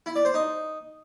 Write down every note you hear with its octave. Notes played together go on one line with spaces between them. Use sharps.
E4
D5
C5
D#4